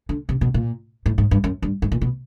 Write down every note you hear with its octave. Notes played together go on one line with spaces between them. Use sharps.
D3
C3
B2
A#2
A2
G#2
G2
F#2
G2
G#2
A#2
B2